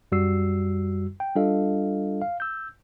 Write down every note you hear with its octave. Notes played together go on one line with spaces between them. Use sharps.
F#2 G3 F#4 E6 C7
G5
G3 D4 F4 A4 D#5 F5
F5
E6 G6